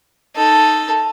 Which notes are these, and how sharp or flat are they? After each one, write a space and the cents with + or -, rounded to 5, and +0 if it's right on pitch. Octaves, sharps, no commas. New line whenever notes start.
D#4 +0 A4 +0